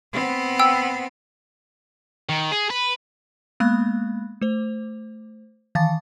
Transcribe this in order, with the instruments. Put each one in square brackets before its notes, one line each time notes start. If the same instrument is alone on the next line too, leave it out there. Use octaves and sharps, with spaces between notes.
[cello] B3 C4
[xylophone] G5 E6
[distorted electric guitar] D#3
G#4
B4
[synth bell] G#3 A#3 B3 F5 B5 F#6
A3 C5
D#3 E3 F5 A5 A6